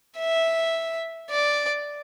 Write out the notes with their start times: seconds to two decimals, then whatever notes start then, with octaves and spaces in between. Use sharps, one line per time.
0.19 E5
1.30 D5